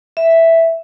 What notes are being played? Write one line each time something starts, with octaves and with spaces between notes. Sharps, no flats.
E5